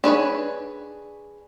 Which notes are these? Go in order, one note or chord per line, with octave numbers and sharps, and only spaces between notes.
D4 G#4 B4 C#5